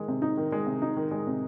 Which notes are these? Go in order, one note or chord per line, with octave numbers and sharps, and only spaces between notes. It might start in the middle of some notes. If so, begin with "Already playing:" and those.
Already playing: D#3 G#3
C3
D#4
D#3
G#3
C3
D#4
D#3
G#3
C3